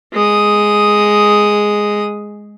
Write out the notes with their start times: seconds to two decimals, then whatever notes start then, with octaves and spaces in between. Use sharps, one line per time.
0.14 G#3 D#6